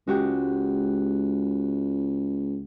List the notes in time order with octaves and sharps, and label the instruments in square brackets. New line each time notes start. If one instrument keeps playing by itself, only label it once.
[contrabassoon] C#2 [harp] G#3 F#4 G4